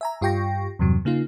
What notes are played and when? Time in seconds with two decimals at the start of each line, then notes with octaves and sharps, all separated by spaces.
0.01 E5 G#5 A#5
0.21 G2 F4 G4 G5 C#6 A#6
0.79 E2 G2 C3 F#3
1.05 C#3 A#3 D#4 F4